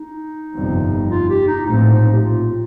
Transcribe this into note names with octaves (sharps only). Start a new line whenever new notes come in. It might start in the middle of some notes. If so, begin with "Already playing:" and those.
Already playing: D#4
G1 F2 C3 G3
F4
G4
D#4
A#1 A2 F3 A3 C4 D#4
G4
F4
F4